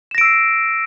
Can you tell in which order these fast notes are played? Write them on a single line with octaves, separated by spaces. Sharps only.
E7 A#6 D7 E6 C7